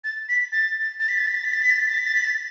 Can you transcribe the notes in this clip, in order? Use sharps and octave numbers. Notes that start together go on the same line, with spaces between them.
A6
B6
A6
A6
B6
A6
B6
A6
B6
A6
B6
A6
B6
A6
B6
A6
B6
A6